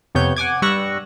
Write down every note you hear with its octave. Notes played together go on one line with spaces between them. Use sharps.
F2 C3 B3 C#5 G6
F#5 G#5 D6 G#6
G2 G3 C#6 E6 F#6 A#6